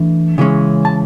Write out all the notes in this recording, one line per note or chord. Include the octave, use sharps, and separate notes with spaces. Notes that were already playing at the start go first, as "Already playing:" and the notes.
Already playing: E3 A3 D4
C#3 E3 G#3 C#4
A5